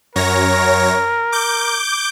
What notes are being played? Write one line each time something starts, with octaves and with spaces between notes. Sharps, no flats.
F#2 A#4 C#5 A#6
D6 G6